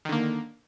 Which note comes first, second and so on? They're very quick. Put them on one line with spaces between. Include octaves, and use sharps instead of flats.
D#3 D3 A#3